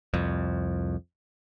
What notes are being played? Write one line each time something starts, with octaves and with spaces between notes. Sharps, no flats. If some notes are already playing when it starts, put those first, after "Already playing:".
C2 F2